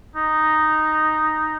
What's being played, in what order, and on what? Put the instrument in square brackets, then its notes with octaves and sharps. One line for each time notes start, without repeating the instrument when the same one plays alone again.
[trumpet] D#4